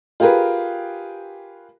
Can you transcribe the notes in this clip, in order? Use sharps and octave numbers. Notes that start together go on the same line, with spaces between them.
F4 G4 G#4 A#4 B4